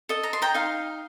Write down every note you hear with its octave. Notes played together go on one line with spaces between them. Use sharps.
A4 D#5
A#5
C6
G5 A#5
D#4 F5